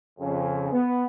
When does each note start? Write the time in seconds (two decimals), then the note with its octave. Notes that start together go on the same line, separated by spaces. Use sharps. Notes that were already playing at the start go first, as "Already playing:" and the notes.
0.19 F2 C#3
0.71 B3